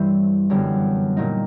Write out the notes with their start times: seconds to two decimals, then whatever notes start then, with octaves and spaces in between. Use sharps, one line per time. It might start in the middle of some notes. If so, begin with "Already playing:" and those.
Already playing: G2 E3 G3 C4
0.50 F#2 D3 G3 B3
1.17 A#2 G3 A#3 D#4